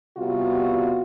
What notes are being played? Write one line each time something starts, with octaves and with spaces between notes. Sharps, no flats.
C3 G3 B3 F4 F#4